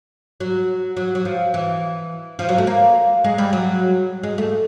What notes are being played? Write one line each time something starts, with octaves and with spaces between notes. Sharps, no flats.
F#3
F#3
F#3
F3
E3
F3
F#3
A3
A#3
G#3
G3
F#3
G#3
A3